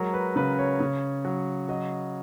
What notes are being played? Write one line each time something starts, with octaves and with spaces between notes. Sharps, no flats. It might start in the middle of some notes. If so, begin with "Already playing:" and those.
Already playing: F#3 G#3 A#4
B4
C#3 B4
C#5
C#3
F#3
F#3 D#5